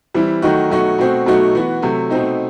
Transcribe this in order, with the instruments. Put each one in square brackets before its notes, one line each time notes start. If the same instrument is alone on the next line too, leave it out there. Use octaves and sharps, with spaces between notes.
[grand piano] E3 G3 C4 E4
D#3 F#3 A3 D#4 F#4
B2 F#3 A3 D#4 F#4
B2 A3 C4 F#4
B2 F#3 A3 D#4 F#4
E3 B3 F#4
C3 F#3 A3
B2 A3 C4 D#4